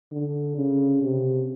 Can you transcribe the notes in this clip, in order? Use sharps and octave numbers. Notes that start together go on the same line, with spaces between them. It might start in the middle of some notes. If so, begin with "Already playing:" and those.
D3
C#3
C3